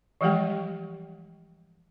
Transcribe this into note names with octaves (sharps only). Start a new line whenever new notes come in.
E3 F3 G3 G#3 G4 G5